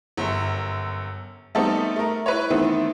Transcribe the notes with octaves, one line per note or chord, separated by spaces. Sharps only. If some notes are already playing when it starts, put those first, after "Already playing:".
G1 F#2
G3 A3 B3 C4 D#4 A4
A3 A#4
E4 B4 C#5
D#3 E3 A3 B3 C4